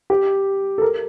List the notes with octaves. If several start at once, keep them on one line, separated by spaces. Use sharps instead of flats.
G4
A4
A#4